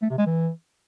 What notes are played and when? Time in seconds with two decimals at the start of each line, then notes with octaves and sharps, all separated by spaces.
0.02 A3
0.10 C3
0.18 G#3
0.26 E3